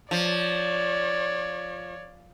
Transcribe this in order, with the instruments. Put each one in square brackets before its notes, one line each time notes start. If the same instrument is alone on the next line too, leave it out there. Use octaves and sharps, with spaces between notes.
[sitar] F3 [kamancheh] C#5 D5